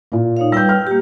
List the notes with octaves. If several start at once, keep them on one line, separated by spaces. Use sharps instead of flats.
A#2 A#3
D#4 C#5 F5
G3 B4 G5 E6 G6
F6
A#3 G4